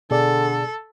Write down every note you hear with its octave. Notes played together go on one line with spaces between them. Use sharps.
B2 D3 G#4 A4 D5